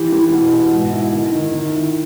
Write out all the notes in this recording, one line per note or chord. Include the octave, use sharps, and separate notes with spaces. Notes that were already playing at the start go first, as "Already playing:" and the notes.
Already playing: E3 G4
E3
B2
B2
G#2
E4
D#3
D#3
D#3
E4